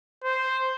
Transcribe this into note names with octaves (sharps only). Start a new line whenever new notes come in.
C5